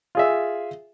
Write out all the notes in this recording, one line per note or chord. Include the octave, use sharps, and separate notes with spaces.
F4 G#4 E5